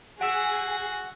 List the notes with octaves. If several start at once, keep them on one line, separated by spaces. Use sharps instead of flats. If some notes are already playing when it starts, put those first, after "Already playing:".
F#4 G#4 F#5 E6 B6 D7